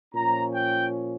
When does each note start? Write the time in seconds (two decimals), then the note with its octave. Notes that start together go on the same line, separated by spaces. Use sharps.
0.14 A#2 F3 C#4 A#5
0.55 G5